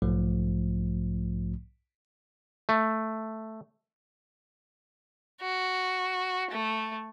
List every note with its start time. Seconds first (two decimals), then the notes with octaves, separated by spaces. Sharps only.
0.02 B1 G#2 F3 A3
2.69 A3
5.41 F#4
6.51 A3